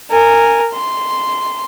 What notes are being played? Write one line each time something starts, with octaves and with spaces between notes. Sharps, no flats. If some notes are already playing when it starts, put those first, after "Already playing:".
A#4 G#5
C6